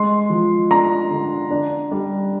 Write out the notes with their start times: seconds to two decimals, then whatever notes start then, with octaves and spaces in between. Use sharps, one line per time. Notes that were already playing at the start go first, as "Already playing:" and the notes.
Already playing: G#3 C6
0.30 F3
0.70 D4 A#5
1.10 D3
1.50 D4
1.92 G3